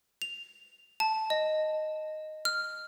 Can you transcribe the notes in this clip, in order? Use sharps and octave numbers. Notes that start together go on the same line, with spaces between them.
F7
A5
D#5
F6